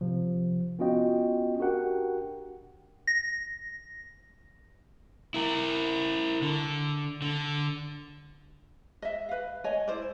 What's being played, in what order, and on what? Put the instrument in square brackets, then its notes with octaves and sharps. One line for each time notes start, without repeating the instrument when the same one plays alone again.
[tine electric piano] C3 F3
B3 C#4 F4 F#4 D#5 G5
D4 F#4 G4 A#4 F#5 G5
[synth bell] A#6
[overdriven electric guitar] E4 A#4
D3
D3
[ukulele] D#5 E5
B4 F5
C#5 D#5 G#5
E4 C5 D5